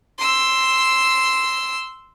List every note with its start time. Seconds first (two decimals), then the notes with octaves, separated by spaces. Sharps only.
0.18 C6 E6